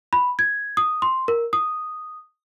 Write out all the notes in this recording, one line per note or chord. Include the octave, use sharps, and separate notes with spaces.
B5
G#6
D#6
C6
A#4
D#6